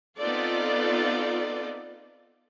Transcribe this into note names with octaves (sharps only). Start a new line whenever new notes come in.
B3 C4 D#4 F4 A4 D5